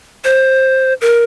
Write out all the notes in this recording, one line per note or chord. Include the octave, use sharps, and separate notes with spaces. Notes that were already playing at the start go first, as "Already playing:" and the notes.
C5
A#4